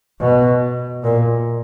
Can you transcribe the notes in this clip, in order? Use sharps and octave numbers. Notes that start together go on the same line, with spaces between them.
B2
A#2